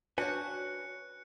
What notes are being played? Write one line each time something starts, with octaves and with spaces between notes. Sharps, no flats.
D4 F#4 B4 C#5 G5 G#5 F#6 C#7